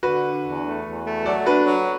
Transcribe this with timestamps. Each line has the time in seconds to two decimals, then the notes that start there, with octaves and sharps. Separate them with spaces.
0.03 D3 F#4 B4
0.23 D4
0.44 E2
0.63 A3
0.84 E2
1.04 A3
1.25 F#3 A4 D5
1.46 D4 F#4 B4
1.67 F#3